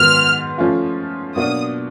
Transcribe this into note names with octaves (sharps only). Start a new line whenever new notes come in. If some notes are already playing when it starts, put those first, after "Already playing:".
Already playing: G#2 D#3 F#3 B3 F6
F3 A3 C#4 F4
B2 F#3 A#3 D4 D#6